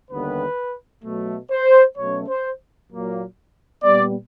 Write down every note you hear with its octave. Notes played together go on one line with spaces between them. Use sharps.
D#2 D3 G3 B3 B4
B2 F#3 A3
C5
B2 F#3 A3 C#4 C#5
C5
A#2 F#3 A#3
A#2 G3 B3 D5